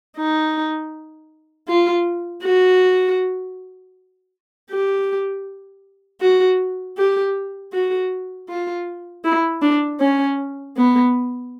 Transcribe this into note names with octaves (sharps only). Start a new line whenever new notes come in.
D#4
F4
F#4
G4
F#4
G4
F#4
F4
E4
D4
C#4
B3